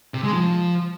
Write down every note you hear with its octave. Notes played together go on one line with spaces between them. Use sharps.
C3
G#3
F3